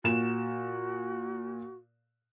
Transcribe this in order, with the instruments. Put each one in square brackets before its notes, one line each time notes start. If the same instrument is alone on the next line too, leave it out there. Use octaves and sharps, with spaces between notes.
[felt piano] A#2 E7 [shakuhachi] F#4